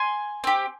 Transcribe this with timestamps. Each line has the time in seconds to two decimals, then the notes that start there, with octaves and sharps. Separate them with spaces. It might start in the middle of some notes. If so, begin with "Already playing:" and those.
Already playing: G#5 C6
0.44 C4 G4